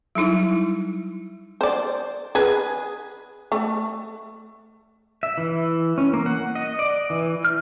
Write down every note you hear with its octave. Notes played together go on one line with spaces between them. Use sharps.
F#3 G3 D#4 E4
C5 D5
G#4 B4
A3
E5
E3
C#4
A#3
F#5
D#5
D5
E3
F6